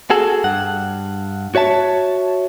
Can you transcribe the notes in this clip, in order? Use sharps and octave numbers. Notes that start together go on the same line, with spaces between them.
F#4 G#4 A4
G2 F#5
F#4 C#5 E5 A5